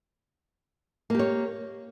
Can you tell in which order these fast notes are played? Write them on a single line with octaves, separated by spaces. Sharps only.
A#3 G4 C#5